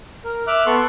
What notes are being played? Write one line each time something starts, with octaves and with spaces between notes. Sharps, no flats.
A#4
E5 D6 F6 F#6
B3 A4 C6 C#6 F#6